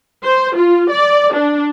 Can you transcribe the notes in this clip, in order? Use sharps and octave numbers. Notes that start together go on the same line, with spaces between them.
C5
F4
D5
D4